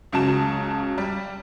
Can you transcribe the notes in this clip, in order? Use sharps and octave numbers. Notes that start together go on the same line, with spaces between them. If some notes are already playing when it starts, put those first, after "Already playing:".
C#2 C#3 F#3 A5 E7
G3